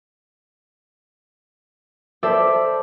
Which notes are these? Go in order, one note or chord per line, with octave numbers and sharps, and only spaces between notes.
A4 C5 D5 E5